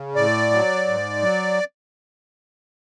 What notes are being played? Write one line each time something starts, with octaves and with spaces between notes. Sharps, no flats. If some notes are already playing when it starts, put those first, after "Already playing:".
Already playing: C#3
A2 D5
F#3
G#2
F#3